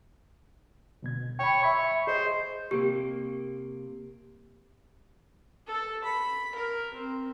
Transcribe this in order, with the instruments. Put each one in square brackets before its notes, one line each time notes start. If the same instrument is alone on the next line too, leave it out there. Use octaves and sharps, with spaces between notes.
[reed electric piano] D2 B2 G#6
[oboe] C#5 [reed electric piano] G5 B5
[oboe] C#5 [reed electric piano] E5 B5 C#6
[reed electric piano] G#4 D#5 [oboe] C5
[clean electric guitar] C3 A#3 [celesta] G4
[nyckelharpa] A4
B5
A#4
C4